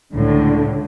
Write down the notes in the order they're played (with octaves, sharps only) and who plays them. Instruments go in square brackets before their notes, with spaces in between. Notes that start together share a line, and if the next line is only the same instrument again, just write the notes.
[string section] C#2 A2 D3